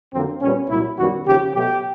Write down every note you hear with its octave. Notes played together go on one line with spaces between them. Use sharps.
F2 D3 F#3 A#3 C4
A#2 G3 B3 C#4
C2 A#2 F#3 E4
F#2 D#3 G3 B3 F#4
D#2 C#3 F3 G4
B2 F#3 A3 G4